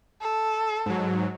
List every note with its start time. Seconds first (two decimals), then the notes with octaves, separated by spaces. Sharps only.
0.22 A4
0.86 G#2 F#3